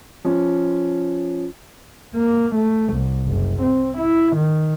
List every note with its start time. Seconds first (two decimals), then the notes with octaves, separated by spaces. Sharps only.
0.25 F3 C#4
2.15 A#3
2.55 A3
2.93 C2
3.26 F#1
3.62 C4
3.98 E4
4.36 D#3